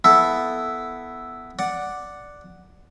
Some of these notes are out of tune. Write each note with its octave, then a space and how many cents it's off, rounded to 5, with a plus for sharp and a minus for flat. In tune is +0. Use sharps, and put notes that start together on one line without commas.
B3 +0 E4 +0 A4 +0
D5 +0 F#5 +0